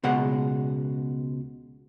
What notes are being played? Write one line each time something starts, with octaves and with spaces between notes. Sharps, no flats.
C#2 B2 G#3 F#5